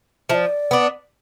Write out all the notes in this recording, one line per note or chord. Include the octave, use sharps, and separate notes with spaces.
F3 D5 E5
B3 D4